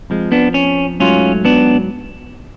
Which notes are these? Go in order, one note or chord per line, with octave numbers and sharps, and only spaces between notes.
F2 F3 G#3
B3 D4
C#4
G#2 F#3 A3 C#4 F4
B3 D4